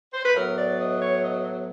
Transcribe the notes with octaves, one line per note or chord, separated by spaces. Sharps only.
C5
B4
A2 F#3 B3 A#4
D5
D#5
C#5
D#5